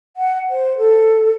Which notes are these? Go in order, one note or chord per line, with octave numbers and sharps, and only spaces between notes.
F#5
C5
A4